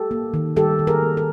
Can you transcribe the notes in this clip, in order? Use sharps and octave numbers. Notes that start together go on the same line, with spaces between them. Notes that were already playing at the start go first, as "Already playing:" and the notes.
Already playing: G4 A4
A#3
D#3
G3 G4 A4
D#3
G#4 A#4
A#3
A4